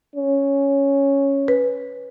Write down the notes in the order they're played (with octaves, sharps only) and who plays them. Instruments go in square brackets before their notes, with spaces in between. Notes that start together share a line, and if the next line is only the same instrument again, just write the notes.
[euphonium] C#4
[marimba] B4